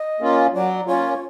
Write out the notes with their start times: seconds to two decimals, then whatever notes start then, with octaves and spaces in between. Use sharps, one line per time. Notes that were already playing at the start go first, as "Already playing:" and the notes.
Already playing: D#5
0.20 A#3 C#4 F4
0.54 F#3 D5
0.87 A#3 C#4 F4 C#5